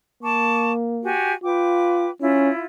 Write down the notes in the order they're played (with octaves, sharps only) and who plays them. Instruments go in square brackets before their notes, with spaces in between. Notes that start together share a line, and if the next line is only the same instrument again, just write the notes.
[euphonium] A#3 [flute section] A5 C#6 D6
[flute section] F#4 G4 G#5
[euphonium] F4 [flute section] B4 G5 D6
[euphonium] C#4 [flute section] E4 F4